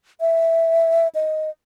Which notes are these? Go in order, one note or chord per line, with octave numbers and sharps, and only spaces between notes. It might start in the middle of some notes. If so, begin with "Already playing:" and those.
E5
D#5